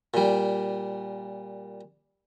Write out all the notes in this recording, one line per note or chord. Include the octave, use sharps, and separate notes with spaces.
A#2 G3